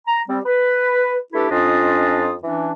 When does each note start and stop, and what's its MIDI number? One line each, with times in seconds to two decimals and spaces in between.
0.07 0.20 82
0.28 0.39 55
0.28 0.39 60
0.45 1.16 71
1.33 1.47 57
1.33 1.47 62
1.33 1.47 64
1.33 1.47 67
1.33 1.47 69
1.33 1.47 71
1.50 2.34 41
1.50 2.34 61
1.50 2.34 62
1.50 2.34 65
1.50 2.34 75
1.50 2.34 87
2.43 2.71 52
2.43 2.71 61
2.43 2.71 62